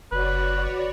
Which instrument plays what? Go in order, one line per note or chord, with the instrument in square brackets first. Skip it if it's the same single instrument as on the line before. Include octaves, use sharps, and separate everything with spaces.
[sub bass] F#1 [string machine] F#4 C#5 D5 [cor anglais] B4